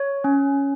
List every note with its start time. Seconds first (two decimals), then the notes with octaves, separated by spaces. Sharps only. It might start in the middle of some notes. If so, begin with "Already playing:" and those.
Already playing: C#5
0.24 C#4